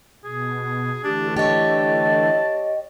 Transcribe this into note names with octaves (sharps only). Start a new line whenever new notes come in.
B2 G#4
D3 E3 A3 D4 G4
G4 C#5 D#5 A5